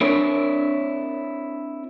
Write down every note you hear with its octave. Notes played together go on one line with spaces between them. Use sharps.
C4 D4 E4 A#4 C#5 D5